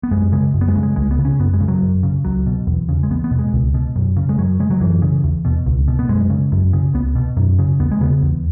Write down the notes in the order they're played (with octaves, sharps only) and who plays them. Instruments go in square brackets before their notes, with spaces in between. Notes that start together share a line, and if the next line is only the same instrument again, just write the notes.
[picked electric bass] B3
F#2 G#3
C#3 G#3
F#2
B3
G#3
C#3
G#3
C#2 G#3
B3
C#3
C#4
F#2 B3
G#3
C#3
F#3
F#2
C#3
C#2 F#3
B2
E2
C#3
G#3
E2 B3
B3
B2
G#3
C#2
B2
F#2
C#3
G#3
F#2 F#3
C#3 G#3
F#3
F#2 E3
C#3
E2
B2
C#2
B2
B3
F#2 G#3
C#3
F#2
C#3
C#2 B3
B2
F#2
C#3
E2 B3
G#3
C#3 B3
E2